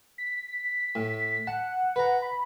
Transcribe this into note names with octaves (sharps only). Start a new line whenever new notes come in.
B6
A2
F#5 A5
B4 A#5
B5